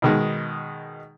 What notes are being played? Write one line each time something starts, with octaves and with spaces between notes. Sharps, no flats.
B2 D#3 G#3